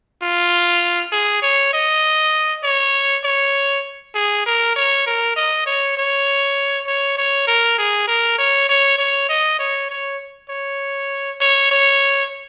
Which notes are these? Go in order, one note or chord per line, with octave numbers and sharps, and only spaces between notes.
F4
G#4
C#5
D#5
C#5
C#5
G#4
A#4
C#5
A#4
D#5
C#5
C#5
C#5
C#5
A#4
G#4
A#4
C#5
C#5
C#5
D#5
C#5
C#5
C#5
C#5
C#5